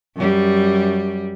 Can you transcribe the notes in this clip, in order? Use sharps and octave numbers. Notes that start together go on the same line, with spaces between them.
F#2 G3